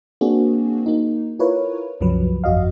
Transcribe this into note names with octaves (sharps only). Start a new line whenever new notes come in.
A#3 C4 D4 F#4 G#4
A#3 D#4
E4 F4 A#4 B4 C#5
C2 F#2 C#3 F3 F#3 B4
G1 F2 F#4 D#5 F5